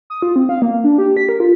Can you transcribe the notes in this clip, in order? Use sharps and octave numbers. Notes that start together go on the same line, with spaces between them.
D#6
F4
C4
F5
A#3
D4
G4
B6
A#4
F4